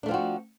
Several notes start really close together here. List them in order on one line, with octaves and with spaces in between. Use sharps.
D4 A3 F3 C4 F#4